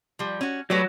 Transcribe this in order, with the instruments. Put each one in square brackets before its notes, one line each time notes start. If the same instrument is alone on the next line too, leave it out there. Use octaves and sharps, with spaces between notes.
[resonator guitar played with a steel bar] F3 G3
C#4 F#4
[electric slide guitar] F#3 [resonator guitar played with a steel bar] G3 A3 B4